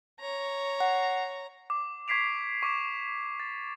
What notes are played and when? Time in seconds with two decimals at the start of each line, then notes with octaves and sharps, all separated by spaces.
0.20 C#5 A#5
0.80 F#5
1.70 D6
2.08 C#6 G#6 B6 C7 D7 F7
2.63 C#6 D6 C7 D7 E7
3.40 A6